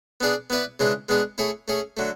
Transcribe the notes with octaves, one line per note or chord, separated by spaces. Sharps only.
B3 D4 G#4 D5
B3 E4 B4 D5
C#3 E3 G#3 D4
G#3 B3 D4 G#4
A3 E4 G#4 C#5
A3 C#4 G#4
D3 F#3 A3